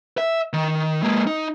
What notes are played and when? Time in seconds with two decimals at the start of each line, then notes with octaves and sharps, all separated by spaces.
0.18 E5
0.53 D#3
1.03 G#3 A#3
1.27 D#4